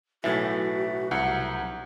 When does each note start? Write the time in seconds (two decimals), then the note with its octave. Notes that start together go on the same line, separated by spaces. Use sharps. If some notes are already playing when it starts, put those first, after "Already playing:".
0.24 B1 A2 E3 F#4 E5 A6
1.11 C2 F#5 A#5